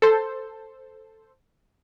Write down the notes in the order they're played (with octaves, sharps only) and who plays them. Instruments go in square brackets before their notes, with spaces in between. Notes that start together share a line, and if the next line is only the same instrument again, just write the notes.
[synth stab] A4 C5